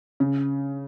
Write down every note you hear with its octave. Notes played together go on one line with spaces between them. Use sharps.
C#3